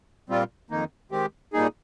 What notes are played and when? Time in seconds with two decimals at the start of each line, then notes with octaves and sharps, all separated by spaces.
0.29 A#2 G3 C4 F4
0.70 F2 D#3 A#3 D#4
1.11 D#3 G#3 C4 G4
1.53 A#2 G3 A#3 D#4 G#4